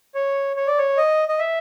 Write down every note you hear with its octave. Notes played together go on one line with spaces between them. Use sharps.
C#5
C#5
D5
C#5
D#5
D#5
E5